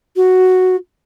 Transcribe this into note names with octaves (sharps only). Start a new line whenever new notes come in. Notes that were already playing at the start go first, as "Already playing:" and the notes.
F#4